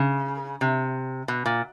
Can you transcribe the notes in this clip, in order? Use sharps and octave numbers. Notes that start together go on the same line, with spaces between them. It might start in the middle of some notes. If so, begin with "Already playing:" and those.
Already playing: C#3
C3
B2
A#2